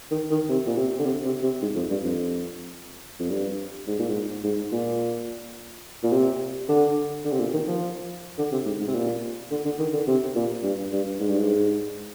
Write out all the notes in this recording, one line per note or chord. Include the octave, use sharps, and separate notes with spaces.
D#3
D#3
C3
A#2
C3
D3
C3
C3
C3
G#2
F2
G2
F2
F2
G2
G#2
A#2
G#2
G#2
A#2
A#2
C3
D3
D3
C3
A#2
D#3
F3
D3
C3
G#2
G#2
C3
A#2
D3
D3
D#3
D3
C3
A#2
G2
G2
G#2
G2
G#2